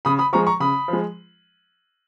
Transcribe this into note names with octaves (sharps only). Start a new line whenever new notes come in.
C#3 B5 D#6
B5 D#6
F3 G#3 A#5 C#6
A#5 C#6
C#3 B5 D#6
F3 G#3